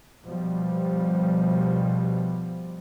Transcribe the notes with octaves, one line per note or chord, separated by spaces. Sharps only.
B2 F3 G3